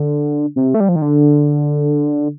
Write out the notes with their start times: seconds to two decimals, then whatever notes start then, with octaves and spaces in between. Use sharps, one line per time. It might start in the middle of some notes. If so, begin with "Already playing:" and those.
Already playing: D3
0.56 C3
0.74 A3
0.80 G3
0.89 F3
0.96 D#3
1.02 D3